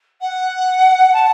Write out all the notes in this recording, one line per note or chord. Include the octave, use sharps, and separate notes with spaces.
F#5
A5